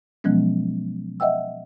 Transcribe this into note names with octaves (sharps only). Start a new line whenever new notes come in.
B2 F3 F#3 G#3 B3 C#4
D#5 E5 F#5 G5 E6